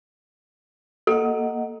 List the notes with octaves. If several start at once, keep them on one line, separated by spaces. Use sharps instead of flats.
A#3 A4 D#5 F#5